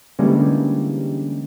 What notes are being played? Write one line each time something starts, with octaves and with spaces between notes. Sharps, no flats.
D3 E3 G3 G#3 A#3 C#4